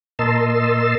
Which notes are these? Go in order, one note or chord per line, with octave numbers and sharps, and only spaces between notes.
A#2 A#4 D#5 A5 C6 E6